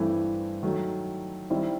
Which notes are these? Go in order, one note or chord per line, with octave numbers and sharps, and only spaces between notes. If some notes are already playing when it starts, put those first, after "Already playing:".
Already playing: G2 E3 A3 C4 E4
D#3 F#3 A3
D#3 G3 C4 E4